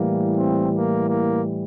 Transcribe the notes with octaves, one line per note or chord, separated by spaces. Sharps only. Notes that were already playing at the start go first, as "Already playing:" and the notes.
Already playing: A2 E3 G3 A#3
C4
A#3
A#3